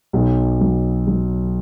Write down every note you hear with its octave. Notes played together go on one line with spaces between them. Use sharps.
B1
F#3
F#3